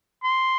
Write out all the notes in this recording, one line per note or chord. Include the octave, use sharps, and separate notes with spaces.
C6